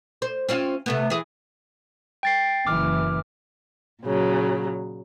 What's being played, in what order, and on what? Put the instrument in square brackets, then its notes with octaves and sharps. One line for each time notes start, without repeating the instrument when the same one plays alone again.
[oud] C5
C4 C#4 F4
C3 A3 B3
E3 G#4
[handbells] G5 A6 C7
[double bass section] F#1 E3 [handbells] D6 F6
[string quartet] A#2 C#3 F#3